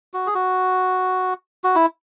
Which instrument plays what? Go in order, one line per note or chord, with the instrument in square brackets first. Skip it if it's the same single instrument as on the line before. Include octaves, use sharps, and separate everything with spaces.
[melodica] F#4
G#4
F#4
F#4
E4